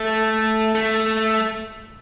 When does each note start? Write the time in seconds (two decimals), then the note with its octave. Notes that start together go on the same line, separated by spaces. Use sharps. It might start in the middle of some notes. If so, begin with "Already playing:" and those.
Already playing: A3
0.75 A3